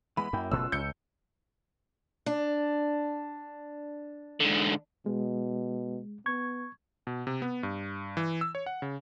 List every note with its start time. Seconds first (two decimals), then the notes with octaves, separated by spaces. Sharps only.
0.17 E3 G#3 B3 B5
0.33 F#2 A#3 E4 G5
0.52 F#1 B2 A3 C#4 F4 E6 F#6
0.72 C#2 G6 C#7
2.26 D4
4.40 G#2 D3
5.06 B2 G#3
6.26 B3 C#6 G#6
7.07 B2
7.27 C3
7.42 B3
7.63 G2
8.17 E3
8.41 E6
8.55 C#5
8.66 F#5
8.82 C#3